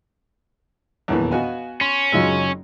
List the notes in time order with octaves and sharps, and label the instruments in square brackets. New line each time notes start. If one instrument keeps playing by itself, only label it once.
[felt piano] D#1 E2 A#3 [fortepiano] B1 E3
[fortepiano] B3 F#4 G#5 [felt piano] D#5 F5
[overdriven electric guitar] C#4 [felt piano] C6
[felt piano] F#1 F#3 E6 [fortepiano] G#3 D#4 F4